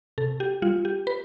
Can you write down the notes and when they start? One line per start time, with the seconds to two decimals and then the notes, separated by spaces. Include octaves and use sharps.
0.18 C3 A4
0.40 G4
0.62 G3 F4
0.85 G4
1.07 B4